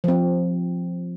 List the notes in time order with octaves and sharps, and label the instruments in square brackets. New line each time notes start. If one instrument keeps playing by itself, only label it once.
[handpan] F3 C4